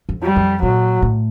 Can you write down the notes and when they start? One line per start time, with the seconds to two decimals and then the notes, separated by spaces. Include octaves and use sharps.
0.09 F2
0.23 G3
0.36 F2
0.62 A#2 F#3
1.02 A2